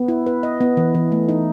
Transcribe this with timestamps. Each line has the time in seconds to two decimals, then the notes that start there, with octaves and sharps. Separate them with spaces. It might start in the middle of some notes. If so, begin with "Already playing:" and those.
Already playing: B3
0.08 E4
0.26 B4
0.43 D#5
0.61 B3
0.77 E3
0.94 E3
1.12 A3
1.29 D#4